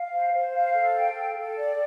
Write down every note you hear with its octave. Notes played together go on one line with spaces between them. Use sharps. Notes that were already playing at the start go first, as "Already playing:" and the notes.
Already playing: F5
C5
C5
F5
A4
G5
A4
A4
D5